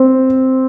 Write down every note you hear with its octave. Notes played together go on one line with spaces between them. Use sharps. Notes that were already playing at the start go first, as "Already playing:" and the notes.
Already playing: C4